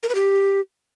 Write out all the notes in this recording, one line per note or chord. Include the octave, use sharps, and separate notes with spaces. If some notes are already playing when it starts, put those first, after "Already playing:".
A#4
B4
G4